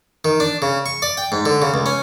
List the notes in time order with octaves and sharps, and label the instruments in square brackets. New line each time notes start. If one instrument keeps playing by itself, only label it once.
[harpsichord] D#3
D4
C#3
C#6
D5
G5
G#2
D3
C#3
C#2
C#4